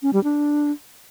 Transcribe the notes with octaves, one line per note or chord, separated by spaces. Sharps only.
C#4
G3
D4